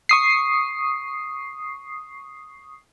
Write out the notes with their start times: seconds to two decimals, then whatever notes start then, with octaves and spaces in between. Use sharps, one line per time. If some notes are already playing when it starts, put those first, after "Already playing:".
0.09 C#6 D#6 C7